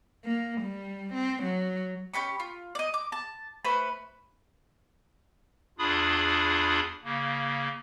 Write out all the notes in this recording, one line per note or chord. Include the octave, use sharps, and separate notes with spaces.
A#3
G3
C4
F#3
C#4 G4 B5 C#6
F4
D5 D#5
D6
A5
A3 B4 C5 B5
E2 D4 F4 G#4 B5 D#6
C#3 A#3